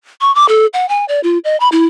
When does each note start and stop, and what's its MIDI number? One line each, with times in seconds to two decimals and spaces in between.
0.21 0.34 85
0.35 0.46 86
0.49 0.66 69
0.73 0.88 78
0.89 1.05 80
1.08 1.20 74
1.24 1.38 65
1.44 1.58 75
1.60 1.69 83
1.72 1.87 64